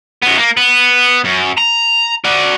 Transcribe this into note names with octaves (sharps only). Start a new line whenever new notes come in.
F#2 B3
A#3
B3
F#2
A#5
F#4 D5